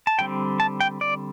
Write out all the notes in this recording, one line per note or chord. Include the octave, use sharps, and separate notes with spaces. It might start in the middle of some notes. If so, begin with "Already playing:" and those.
A5
D3 G3 C4 G5
A5
G5
D5